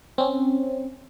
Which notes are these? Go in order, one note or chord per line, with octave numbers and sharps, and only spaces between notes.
C4 C#4